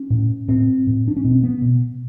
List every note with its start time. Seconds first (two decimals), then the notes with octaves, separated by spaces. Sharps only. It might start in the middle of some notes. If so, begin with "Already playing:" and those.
Already playing: C#4
0.10 A2
0.48 A2 C4
0.87 A2
1.08 D4
1.16 C#4
1.25 B2 C4
1.43 B3
1.62 B2